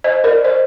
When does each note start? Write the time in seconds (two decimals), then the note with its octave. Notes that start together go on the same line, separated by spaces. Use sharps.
0.04 C5 D#5
0.24 A#4 D5
0.44 C5 D#5